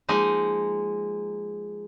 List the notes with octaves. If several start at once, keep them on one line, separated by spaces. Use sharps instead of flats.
F3 G#3 A#3 D#4